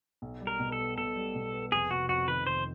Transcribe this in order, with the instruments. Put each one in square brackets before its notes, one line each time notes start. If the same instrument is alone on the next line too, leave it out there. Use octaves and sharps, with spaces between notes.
[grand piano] B1
G3
[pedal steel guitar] A#4
[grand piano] B2
[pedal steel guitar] A4
[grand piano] B3
[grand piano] B1 [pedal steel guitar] A4
[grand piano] G3
B2
B3
[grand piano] F1 [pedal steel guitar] G#4
[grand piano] C3 [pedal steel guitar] F#4
[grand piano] F2 [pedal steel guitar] F#4
[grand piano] D#3 [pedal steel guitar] B4
[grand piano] F1 [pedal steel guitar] C5